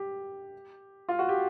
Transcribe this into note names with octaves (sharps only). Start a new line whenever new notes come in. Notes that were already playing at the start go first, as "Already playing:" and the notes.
Already playing: G4
F4
F#4
G4